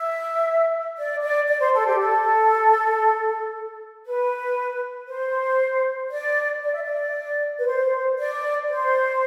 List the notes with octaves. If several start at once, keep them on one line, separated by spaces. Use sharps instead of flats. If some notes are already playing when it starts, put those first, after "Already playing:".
Already playing: E5
D5
D5
D5
C5
A4
G4
A4
B4
C5
D5
D5
E5
D5
B4
C5
D5
C5